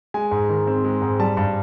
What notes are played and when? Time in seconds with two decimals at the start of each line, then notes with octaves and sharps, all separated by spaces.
0.14 G#3 G#5
0.31 G#2
0.49 D#3
0.67 C4
0.85 G#3
1.02 G#2
1.20 G3 A5
1.37 G2 A5